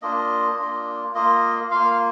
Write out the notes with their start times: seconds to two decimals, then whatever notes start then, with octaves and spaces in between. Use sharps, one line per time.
0.02 A#3 D4 F4 D#5
0.59 A#3 D4 F4
1.15 A#3 F4 D#5
1.71 A#3 F4 F5